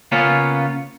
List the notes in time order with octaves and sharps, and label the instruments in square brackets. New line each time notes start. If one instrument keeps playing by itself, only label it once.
[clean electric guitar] C#3 A#3 B3 C#4 F4 C#5